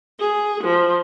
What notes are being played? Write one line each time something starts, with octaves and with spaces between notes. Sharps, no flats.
G#4
F3